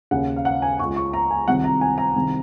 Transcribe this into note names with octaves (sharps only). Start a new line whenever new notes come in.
D#2 C#3 F#5
F5
F#5
G#5
C#2 C#3 C#6
C#6
A#5
G#5
C2 C3 D#3 F#5
A#5
G#5
A#5
C2 C3 D#3